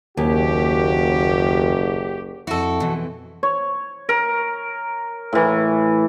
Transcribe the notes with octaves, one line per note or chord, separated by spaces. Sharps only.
F#1 D#2 F#4 G4
F2 E4 F#4 A4
B2 E3 F3
C#5
A#4
A2 E3